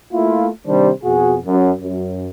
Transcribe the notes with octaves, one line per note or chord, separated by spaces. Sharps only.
A3 A#3 E4 F4
C3 D#3 G3 D4 C5
F2 B2 F#4 G#4
F#2
F#2